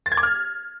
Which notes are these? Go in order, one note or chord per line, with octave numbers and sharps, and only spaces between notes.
A6
G#6
D6
F6